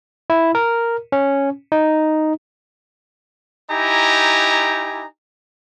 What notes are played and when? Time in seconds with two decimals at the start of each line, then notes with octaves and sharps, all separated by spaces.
0.30 E4
0.55 A#4
1.12 C#4
1.72 D#4
3.69 D#4 E4 G4 G#5 A#5